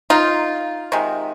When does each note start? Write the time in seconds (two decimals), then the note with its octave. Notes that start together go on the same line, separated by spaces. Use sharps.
0.10 D#4 F4
0.92 C3 D#3 G#3